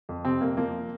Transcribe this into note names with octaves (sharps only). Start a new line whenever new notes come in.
F2
C3 C4
F2 A#3
F3 A#3